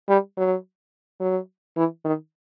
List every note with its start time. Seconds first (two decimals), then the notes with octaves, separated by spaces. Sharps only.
0.09 G3
0.37 F#3
1.21 F#3
1.77 E3
2.05 D#3